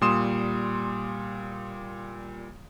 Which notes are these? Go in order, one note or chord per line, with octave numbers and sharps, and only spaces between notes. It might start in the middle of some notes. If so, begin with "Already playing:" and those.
A#2 G3 C6 D#6 E7